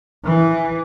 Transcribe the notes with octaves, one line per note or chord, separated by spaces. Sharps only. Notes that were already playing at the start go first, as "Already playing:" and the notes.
E3